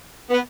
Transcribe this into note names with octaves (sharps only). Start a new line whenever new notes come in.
B3